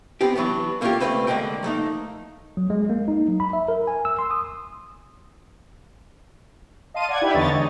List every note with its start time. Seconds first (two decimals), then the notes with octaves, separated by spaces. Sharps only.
0.21 B3 C4 G4
0.35 E3 F#3 B3 D4
0.81 A3 A#3 C#4 D#4 F4 G4
1.00 D2 G#2 A3 C4 B4 C5
1.27 D3 G#3 A#3 A#4 G5
1.63 F3 A3 A#3 D#4
2.57 F#3
2.70 G#3
2.90 A#3
3.08 D#4
3.28 F#3
3.40 B5
3.53 E5
3.68 A#4
3.87 G#5
4.05 E6
4.19 C6
4.31 D#6
6.94 D#5 F5 A5 C6 D#7
7.09 D5 F#5 G#6
7.21 D#4 E4 G4 B4 B5
7.35 E2 D3 E3 C#5 D#5 A6
7.53 G#3 D#4